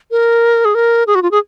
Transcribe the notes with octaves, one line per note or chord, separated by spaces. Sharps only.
A#4
G#4
A#4
G#4
F#4
F4
G#4